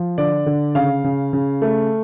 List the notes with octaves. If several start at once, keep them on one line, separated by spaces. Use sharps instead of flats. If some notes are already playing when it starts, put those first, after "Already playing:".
Already playing: F3
D3 D5
D3
C#3 F5
C#3
C#3
A3